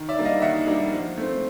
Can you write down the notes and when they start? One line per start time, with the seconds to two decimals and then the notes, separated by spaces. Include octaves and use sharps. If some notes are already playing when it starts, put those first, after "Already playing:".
Already playing: D#3
0.09 D5 E5
0.17 G3 A#3 D4
0.25 D#5 F5
0.42 D#3 E5 F#5
0.67 G3 A#3 D4
0.93 F3
1.18 A3 C4